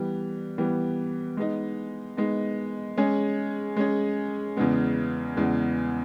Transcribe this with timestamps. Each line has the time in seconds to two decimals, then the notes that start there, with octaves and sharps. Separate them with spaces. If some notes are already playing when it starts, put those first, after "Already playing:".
Already playing: E3 G3 B3
0.58 E3 G3 B3
1.37 G#3 B3 D#4
2.17 G#3 B3 D#4
2.97 G#3 C#4 G#4
3.76 G#3 C#4 G#4
4.57 E2 C#3 G#3 B3
5.36 E2 C#3 G#3 B3